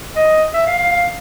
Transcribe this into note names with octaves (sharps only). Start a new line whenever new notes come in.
D#5
E5
F5
F5
F5